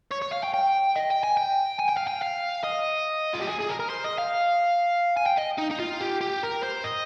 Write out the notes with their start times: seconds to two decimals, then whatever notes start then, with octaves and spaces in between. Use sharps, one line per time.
0.12 C#5
0.22 C#5
0.33 F5
0.44 G5
0.54 G5
0.96 D#5
1.10 G5
1.23 G#5
1.37 G5
1.80 G#5
1.89 G5
1.97 F5
2.08 G5
2.23 F5
2.64 D#5
3.33 F4
3.41 G4
3.48 G#4
3.59 G#4
3.69 A#4
3.80 A#4
3.90 C5
4.05 D#5
4.18 F5
5.17 G#5
5.26 G5
5.38 D#5
5.59 D#4
5.71 D#4
5.80 F4
6.01 G4
6.21 G4
6.43 A#4
6.63 C5
6.84 D#5